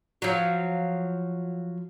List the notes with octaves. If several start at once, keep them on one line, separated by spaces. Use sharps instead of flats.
F3 F#3